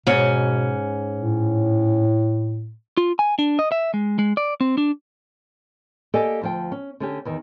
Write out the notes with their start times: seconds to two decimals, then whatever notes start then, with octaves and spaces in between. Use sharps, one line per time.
0.07 G#2 B2 C#4
1.20 A2
2.97 F4
3.19 G#5
3.39 D4
3.59 D#5
3.72 E5
3.94 G#3
4.19 G#3
4.37 D5
4.61 C4
4.78 D4
6.14 A#3 G4 A4 D5 D#5 G#5
6.41 D2 F3 G5
6.72 C#4
7.00 D3 C#4 G4
7.25 E2 D#3